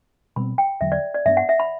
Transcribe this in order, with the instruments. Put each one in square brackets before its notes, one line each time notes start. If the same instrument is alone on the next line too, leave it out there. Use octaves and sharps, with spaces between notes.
[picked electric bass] B2 G3 C4 [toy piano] B5
[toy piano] G5
[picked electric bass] E2 D3 F#3 [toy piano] E5
[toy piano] D5
D5
[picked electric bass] G2 E3 B3 D4 [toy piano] E5
[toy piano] F#5
E5
B5